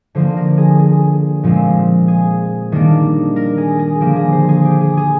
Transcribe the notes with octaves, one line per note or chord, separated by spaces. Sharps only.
D3 F3 A#3 C5
A#4
G#4
G#4
A#2 F3 G#3 C4
G#4
D#3 G3 A#3 D4
A#4
G#4
G#4
D3 F3 A#3 G4
G#4
C5
G#4
G4
G#4
G#4